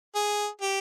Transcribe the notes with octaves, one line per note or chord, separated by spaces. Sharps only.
G#4
G4